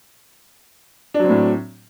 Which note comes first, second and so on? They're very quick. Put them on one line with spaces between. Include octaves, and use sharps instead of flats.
D4 F#3 C4 A2